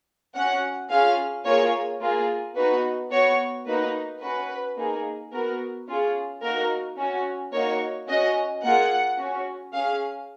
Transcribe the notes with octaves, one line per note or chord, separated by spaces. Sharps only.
C#4 F#4 F#5
C#4 F4 G#4 F5
A#3 F4 G#4 C#5
A#3 F4 G#4
B3 D#4 F#4 B4
B3 F#4 C#5
A#3 D#4 F#4 B4
C#4 F#4 B4
A#3 D#4 G#4
B3 F#4 A#4
C#4 F4 G#4
A#3 D#4 F#4 A#4
C#4 F#4
A#3 D#4 F#4 C#5
C#4 F#4 D#5
A#3 F4 G#4 F#5
C#4 F#4
C#4 G#4 F5